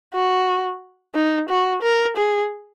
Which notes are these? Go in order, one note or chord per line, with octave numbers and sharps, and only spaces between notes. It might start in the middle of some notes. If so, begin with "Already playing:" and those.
F#4
D#4
F#4
A#4
G#4